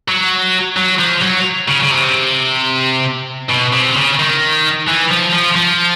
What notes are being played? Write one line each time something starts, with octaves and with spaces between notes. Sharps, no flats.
F#3
F#3
F3
F#3
C#3
C#3
C3
B2
C3
C#3
D#3
E3
F3
F3
F3